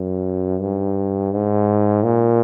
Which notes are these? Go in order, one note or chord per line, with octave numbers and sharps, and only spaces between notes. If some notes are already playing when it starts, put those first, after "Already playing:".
Already playing: F#2
G2
G#2
A#2